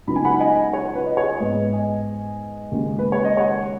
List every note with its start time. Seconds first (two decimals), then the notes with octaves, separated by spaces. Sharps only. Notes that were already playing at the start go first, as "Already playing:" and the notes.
0.07 C#2 C#3 F#3 B3 D#4 B5
0.16 G#5
0.25 F#5 B5
0.40 D#5 G#5
0.73 C#5 F#5
0.95 B4
1.06 D#5
1.17 G#4 C#5
1.40 G#2 G#3 B3 B4 D#5
1.73 D#5 G#5
2.71 D#2 C#3 G#3
2.99 B4
3.12 C#5
3.25 D#5
3.37 C#5 F#5